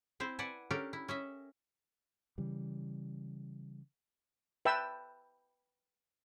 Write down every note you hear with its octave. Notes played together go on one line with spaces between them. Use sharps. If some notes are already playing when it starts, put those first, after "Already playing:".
C4 E4 C5
B4 D5 F#5 G#5 A5
C#4 D4 G4 A4 A#4
E4
C#4 D#5 E5
C#3 E3 G3
B4 E5 G5 A5 E6